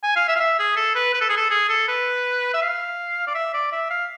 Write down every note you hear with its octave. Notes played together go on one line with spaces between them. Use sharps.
G#5
F5
E5
F5
E5
G#4
A4
B4
B4
A4
G#4
A4
G#4
A4
B4
E5
F5
D5
E5
D5
E5
F5